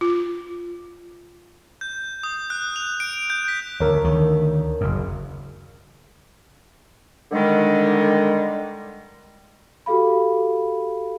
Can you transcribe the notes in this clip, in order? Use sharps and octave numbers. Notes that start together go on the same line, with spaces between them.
F4
G6
D#6
F#6
F7
D7
G6
B6
D2 A#4 C#5
D2 D#3
F#1 F#2
D3 D#3 G3 G#3
F#4 G4 A4 F5 B5